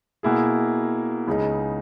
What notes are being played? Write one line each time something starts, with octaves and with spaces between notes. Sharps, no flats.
B2 A#3 E4 G#4
C#2 C#3 G#3 D#4